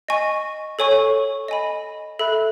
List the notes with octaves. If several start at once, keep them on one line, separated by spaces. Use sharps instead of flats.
D#5 G#5 C#6
A4 C#5 G#5 C#6
D#5 G#5 B5
A4 E5 B5 F#6